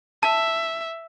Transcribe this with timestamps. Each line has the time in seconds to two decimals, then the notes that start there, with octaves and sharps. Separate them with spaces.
0.23 E5 A5